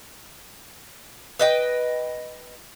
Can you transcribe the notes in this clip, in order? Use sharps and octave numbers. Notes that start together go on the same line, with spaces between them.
B4 D#5 G5